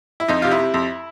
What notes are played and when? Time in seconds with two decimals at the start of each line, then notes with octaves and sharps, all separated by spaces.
0.20 E4
0.28 F2 D#4
0.42 C3 F4
0.51 E4
0.59 C3
0.74 F2